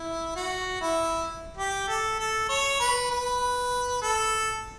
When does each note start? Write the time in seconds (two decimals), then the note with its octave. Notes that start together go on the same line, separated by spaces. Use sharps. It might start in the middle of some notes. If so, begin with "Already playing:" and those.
Already playing: E4
0.36 F#4
0.81 E4
1.57 G4
1.88 A4
2.19 A4
2.49 C#5
2.80 B4
3.10 B4
4.02 A4